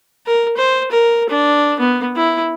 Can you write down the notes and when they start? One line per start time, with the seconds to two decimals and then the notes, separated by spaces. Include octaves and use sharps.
0.26 A#4
0.57 C5
0.92 A#4
1.29 D4
1.80 B3
2.16 E4